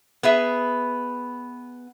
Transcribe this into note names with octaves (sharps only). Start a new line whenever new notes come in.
B3 G#4 E5